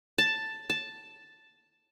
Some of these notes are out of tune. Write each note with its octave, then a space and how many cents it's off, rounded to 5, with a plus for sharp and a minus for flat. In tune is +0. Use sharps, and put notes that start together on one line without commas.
A5 +5
A5 +0